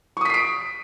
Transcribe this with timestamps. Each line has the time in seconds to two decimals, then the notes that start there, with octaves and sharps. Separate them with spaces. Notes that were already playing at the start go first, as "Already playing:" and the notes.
0.17 C#6
0.21 D#6
0.25 B6
0.30 C7
0.34 D7